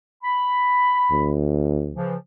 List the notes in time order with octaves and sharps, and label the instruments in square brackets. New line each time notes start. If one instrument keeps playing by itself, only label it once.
[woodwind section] B5
[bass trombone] D2
[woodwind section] C#3 E3 F3